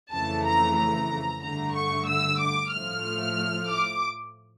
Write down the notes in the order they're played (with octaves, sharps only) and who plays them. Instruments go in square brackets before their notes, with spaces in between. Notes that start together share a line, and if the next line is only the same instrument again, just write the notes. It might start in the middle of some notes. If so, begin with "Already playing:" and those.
[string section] F2 C#3 E3 A3 A5
A#5
A#5
G2 D3 A3 A#5
C#6
E6
D6
A2 F3 A3 F6
D6